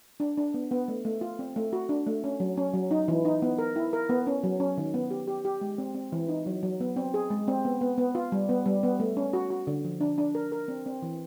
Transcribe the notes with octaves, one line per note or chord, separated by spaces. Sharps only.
D4
D4
B3
B3
A3
A3
F4
C4
A3
F#4
D4
A3
C#4
F#3
C#4
F#3
D#4
E3
D#4
B3
A#4
E4
A#4
B3
C#4
F#3
C#4
D#3
B3
G4
G4
G4
G#3
C4
C4
E3
D#4
F#3
F#3
B3
C4
G#4
G#3
C4
B3
B3
B3
F4
G3
B3
G3
B3
A3
C#4
F#4
F#4
D3
F3
D4
D4
A#4
A#4
C4
C4
E3